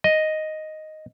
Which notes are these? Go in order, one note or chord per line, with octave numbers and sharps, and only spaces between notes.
D#5